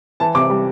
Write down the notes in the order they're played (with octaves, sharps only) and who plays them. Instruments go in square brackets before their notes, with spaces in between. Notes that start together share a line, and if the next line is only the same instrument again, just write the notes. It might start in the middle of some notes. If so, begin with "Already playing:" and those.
[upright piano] E3 A5
C3 D6
G3